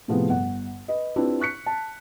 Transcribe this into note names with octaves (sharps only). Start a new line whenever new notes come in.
A2 C3 F3 A3 B3 G#4
G1 F#5
B4 D#5
C4 D4 E4 F4 G4 B4
C#6 F#6 B6 C#7
A5